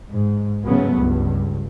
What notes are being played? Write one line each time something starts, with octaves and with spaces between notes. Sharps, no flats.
G#2
G#2 C#3 F#3 A3 B3
C#2 G2